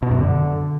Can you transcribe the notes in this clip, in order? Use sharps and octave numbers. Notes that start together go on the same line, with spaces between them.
B2
F#2
D3